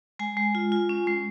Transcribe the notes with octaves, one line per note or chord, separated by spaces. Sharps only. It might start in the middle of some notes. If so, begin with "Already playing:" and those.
G#3 G#5
G#3
F4
F4
C#4
G#3